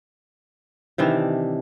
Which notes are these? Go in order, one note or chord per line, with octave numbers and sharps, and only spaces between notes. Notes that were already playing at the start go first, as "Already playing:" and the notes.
C3 D#3 E3 D4